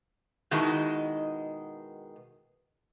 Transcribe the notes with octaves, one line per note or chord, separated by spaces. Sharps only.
B2 D#3 G#3 E4 F#4